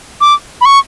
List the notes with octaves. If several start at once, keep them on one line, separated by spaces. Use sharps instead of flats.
D6
B5
C#6